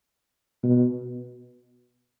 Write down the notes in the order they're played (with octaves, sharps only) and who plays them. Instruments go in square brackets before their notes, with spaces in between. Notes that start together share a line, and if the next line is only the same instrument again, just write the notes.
[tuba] B2